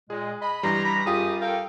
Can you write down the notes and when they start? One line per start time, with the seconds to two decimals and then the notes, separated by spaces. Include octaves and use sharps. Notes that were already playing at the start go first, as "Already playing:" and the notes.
0.10 A#2 G#3 G#4
0.42 D#5 B5
0.63 G2 E3 G3 A#5 C6
0.85 B5
1.06 F#2 G3 F4 G4 G#4 D#6
1.41 A4 A#4 F5 G5